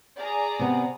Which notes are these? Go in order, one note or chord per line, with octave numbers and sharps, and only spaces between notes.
G#4 D5 A#5
C3 B3